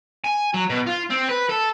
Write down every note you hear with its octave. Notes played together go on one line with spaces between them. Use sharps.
G#5
F#3
B2
F4
C4
B4
A4